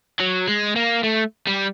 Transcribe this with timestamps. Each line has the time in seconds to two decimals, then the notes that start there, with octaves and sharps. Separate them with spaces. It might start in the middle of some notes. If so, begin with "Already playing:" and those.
0.20 F#3
0.48 G#3
0.76 A#3
1.03 A3
1.47 G3